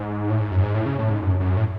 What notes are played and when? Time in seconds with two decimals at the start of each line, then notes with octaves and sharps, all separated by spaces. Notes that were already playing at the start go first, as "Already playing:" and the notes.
Already playing: G#2
0.30 A2
0.40 G#2
0.51 F#2
0.62 G#2
0.74 A2
0.86 C#3
0.99 A2
1.10 G#2
1.22 F#2
1.40 F#2
1.57 A2